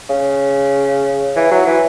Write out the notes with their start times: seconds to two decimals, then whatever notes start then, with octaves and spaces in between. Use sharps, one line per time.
0.10 C#3
1.36 E3
1.51 F#3
1.67 E3